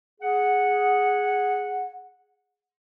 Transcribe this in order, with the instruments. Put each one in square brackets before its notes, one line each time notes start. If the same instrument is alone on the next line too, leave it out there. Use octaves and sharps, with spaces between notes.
[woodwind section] G#4 F#5